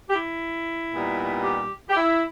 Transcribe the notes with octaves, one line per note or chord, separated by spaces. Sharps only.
G4
E4
A#2 G3 B3 D#4
G4
G4
E4